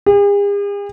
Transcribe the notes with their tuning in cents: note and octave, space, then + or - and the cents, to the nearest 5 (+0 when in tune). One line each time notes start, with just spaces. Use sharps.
G#4 -45